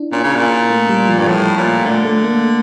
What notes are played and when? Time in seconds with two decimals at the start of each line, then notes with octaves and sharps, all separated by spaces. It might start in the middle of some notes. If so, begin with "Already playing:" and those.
Already playing: D4 E4
0.12 A#2 C#4
0.23 C#3
0.36 A#2
0.70 A3
0.89 G3
1.09 F3
1.18 G2
1.28 A2 F3
1.57 A#2
1.85 D3 A3
2.05 A3
2.24 A#3